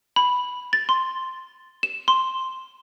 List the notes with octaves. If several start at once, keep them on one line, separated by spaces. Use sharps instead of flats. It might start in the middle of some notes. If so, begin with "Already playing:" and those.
B5
A6
C6
E7
C6